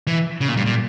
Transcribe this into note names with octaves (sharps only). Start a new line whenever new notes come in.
E3
C#3
A#2
G2
A#2